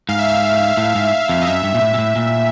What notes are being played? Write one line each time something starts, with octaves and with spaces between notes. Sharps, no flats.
G#2 F5
E5
F5
A2
G#2
F2
D#5
F#2 E5
G2
A#2
A2
A#2
A2
A#2